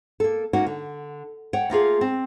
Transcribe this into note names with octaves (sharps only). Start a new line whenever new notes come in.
A#3 A4
A#3 C#4 D#4 F#4
D3
C#5 F#5 G5
A3 A#3 F4 G#4
C4